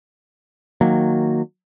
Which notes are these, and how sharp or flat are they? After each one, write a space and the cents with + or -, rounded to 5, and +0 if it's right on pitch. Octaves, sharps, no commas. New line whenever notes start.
D#3 +0 F#3 -15 A#3 -15